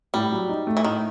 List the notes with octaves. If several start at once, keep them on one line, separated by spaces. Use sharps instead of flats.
A2 G3
F#3
D#4
A3
E3
A2 D#3